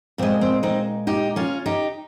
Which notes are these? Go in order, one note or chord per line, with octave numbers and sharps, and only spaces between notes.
A#2 G#3 C4
C4
C4 D#4
D#4 G4
C#4 F4
D#4 G4